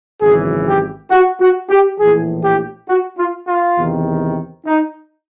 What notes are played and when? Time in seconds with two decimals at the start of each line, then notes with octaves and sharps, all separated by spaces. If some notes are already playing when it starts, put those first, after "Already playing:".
0.21 G#1 F#2 C#3 E3 G#4
0.66 G4
1.11 F#4
1.40 F#4
1.70 G4
2.00 A#1 A2 E3 G#4
2.44 G4
2.88 F#4
3.17 F4
3.47 F4
3.77 E2 C3 D#3
4.66 D#4